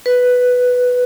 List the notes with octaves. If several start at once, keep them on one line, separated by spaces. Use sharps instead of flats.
B4